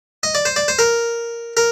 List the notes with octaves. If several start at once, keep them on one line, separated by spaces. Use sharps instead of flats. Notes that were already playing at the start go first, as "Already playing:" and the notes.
D#5
D5
C5
D5
C5
A#4
A#4